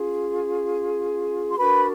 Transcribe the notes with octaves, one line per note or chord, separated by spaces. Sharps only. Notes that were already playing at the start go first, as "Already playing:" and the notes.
Already playing: C#4 F4 G#4
C6
D4 F#4 A#4 B4 B5